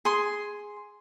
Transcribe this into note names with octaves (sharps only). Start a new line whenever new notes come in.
G#4 C6